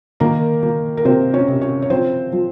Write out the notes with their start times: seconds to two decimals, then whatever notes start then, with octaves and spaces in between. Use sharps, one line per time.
0.20 D#3 A#3 A#4
0.63 A#3
0.97 A#4
1.05 C3 C4 C5
1.33 C#4 C#5
1.48 C3
1.61 C#4 C#5
1.82 C#5
1.90 F3 C4 C5
2.33 F3